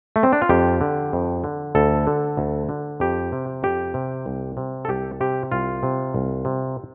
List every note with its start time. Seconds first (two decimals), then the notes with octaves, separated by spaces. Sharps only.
0.16 A3
0.23 C4
0.33 D4
0.42 F4
0.49 F2 G4
0.81 D3
1.13 F2
1.44 D3
1.75 D2 A4
2.07 D3
2.37 D2
2.69 D3
3.00 F2 G4
3.32 C3
3.63 F2 G4
3.94 C3
4.26 C2
4.57 C3
4.85 A4
4.88 C2 G4
5.21 C3 G4
5.52 C2 F4
5.83 C3
6.14 C2
6.45 C3